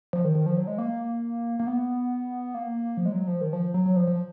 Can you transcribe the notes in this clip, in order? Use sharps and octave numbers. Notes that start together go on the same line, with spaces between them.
F3
D#3
D#3
F3
F#3
G#3
A#3
A#3
B3
A#3
F3
G#3
F#3
F3
D#3
F3
F#3
F#3
F3
F3